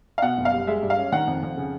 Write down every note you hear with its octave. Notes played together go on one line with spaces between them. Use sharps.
F5
B2 F#5
F#1
F5
G3
G#3 E5
G2
F5
C#4
D#3 F#5
F2
F2
C#3